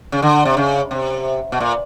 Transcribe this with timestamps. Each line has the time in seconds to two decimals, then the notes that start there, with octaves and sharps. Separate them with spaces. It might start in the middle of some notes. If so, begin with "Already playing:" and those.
0.12 C#3
0.22 D3
0.45 C3
0.57 C#3
0.91 C3
1.52 B2
1.60 A#2